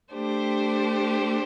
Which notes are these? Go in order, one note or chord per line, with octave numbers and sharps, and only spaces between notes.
A3 D4 G4 C5